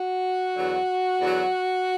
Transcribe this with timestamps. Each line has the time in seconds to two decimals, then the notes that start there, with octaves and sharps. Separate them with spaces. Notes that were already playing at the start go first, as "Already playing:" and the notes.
Already playing: F#4
0.55 E2 D3 F#3
1.20 E2 D3 F#3